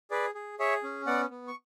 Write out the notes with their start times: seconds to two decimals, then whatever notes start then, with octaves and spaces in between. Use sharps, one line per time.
0.11 G#4 B4 D5
0.35 G#4
0.59 G#4 C#5 E5
0.84 C#4
1.07 B3 D5 F#5
1.30 B3
1.48 C#6